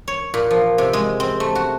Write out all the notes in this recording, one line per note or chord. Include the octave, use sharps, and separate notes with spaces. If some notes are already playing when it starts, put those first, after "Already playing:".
C#5
A#2
F3
C3
G#3
C4
A3
F#4